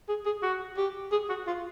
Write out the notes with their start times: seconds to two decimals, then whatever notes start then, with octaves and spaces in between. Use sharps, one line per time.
0.09 G#4
0.26 G#4
0.42 F#4
0.77 G4
1.12 G#4
1.29 F#4
1.47 F4